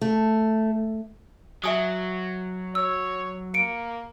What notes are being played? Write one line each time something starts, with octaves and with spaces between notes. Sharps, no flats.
A3
F#3 E5 G#5 D#6
C#5 E6
A#3 C#7 D7